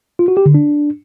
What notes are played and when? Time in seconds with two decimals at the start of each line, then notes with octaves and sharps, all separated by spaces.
0.19 F4
0.28 F#4
0.37 G4
0.46 D3
0.54 D4